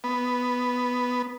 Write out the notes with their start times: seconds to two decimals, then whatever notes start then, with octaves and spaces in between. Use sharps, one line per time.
0.04 B3